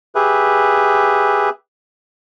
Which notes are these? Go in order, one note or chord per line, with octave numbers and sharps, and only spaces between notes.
G4 G#4 B4 E5